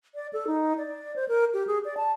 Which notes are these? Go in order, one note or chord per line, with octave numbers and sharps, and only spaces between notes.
D5
A4
D#4
D5
C5
A#4
G4
G#4
D5
A5